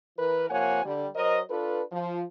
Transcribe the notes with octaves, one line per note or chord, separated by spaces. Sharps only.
E3 A#4 B4
C3 F3 A#3 C#5 F#5 G#5
D3 G3
F#3 A#4 C5 D#5
D4 F4 A4 B4
F3